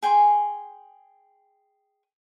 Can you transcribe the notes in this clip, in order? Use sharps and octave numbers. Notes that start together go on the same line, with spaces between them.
G#4 G5 G#5 C6